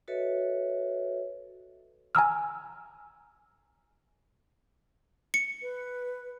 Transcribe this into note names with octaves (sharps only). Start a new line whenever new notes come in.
F#4 A4 B4 C#5 D#5 E5
G#5 A#5 E6 F6
C#7
B4